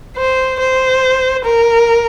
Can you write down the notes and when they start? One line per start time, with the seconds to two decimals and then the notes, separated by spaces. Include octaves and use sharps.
0.17 C5
0.60 C5
1.45 A#4